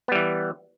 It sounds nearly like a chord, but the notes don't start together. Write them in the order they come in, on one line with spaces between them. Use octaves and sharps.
B3 G3 E3